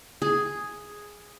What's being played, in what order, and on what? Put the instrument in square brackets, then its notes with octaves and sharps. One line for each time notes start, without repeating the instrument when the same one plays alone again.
[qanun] G#4